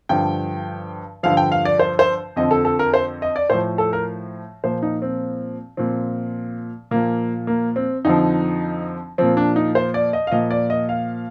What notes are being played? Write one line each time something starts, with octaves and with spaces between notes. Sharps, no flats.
G2 D3 F3 G5
G2 D3 F3 F5
G5
F5
D5
C5
C5
F2 D3 F3 D#5
A4
A4
A#4
C5
D#5
D5
A2 F3 C5
A4
A#4
A#2 F3 C5
D#4
C4
A#2 F3 C4
A#2 F3 A#3
A#3
C4
F2 D3 F3 D#4
A#2 F3 C4
D4
D#4
C5
D5
D#5
F5
A#2 F3 D#5
D5
D#5
F5